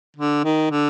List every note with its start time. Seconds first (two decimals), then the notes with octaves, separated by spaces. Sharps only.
0.16 D3
0.44 D#3
0.71 D3